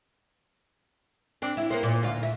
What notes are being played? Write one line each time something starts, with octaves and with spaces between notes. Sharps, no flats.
C4 D4
E4
A#3 B3 C5
A#2
D2 F4
E5